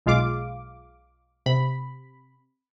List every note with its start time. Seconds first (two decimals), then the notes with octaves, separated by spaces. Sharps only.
0.06 B1 G#3 F4 F5 D6
1.46 C3 B5